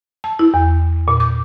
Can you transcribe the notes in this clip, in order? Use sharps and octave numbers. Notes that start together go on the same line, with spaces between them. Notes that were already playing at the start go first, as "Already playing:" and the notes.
A5
E4
E2
A#2
D6